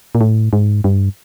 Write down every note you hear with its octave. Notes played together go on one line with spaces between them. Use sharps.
A#2
A2
G#2
G2